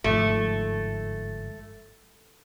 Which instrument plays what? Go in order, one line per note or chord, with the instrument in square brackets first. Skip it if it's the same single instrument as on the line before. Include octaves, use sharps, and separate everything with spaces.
[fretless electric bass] G1 G#2 F3 [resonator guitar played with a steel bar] A3